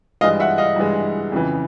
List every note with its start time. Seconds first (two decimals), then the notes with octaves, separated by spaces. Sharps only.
0.21 G2 E3 G#3 D#5 F5
0.40 E5 F#5
0.58 D#5 F5
0.76 G2 E3 G#3
1.32 F2 C#3 E3